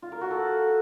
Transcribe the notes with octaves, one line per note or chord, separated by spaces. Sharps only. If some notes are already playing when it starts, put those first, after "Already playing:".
F4
A#4
F#4
A4